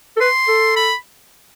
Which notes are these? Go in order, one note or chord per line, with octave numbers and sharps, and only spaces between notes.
A4
B4 C6
A4
B5